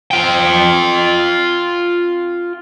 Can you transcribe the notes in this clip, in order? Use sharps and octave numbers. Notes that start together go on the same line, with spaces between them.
F4 G5